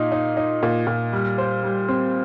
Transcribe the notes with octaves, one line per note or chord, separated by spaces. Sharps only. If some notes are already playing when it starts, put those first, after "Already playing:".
Already playing: A#2 D#4
D#4
D#4
A#2
A#2
G3
C5
G3
C4